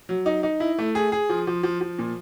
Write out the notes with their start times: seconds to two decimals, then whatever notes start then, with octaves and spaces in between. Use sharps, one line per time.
0.09 F#3
0.26 D#4
0.43 D#4
0.60 E4
0.78 A3
0.95 G#4
1.12 G#4
1.29 F3
1.47 F3
1.63 F3
1.81 F3
1.99 A#2